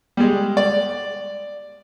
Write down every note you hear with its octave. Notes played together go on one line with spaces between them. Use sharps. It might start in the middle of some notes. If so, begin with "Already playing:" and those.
G3 G#3
D5